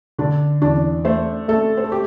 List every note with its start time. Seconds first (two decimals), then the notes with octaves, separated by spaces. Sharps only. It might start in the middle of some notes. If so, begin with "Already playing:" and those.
0.19 D3 D4
0.62 E2 D4
1.05 A3 C5
1.48 A3 A4
1.77 C5
1.84 A4
1.92 G4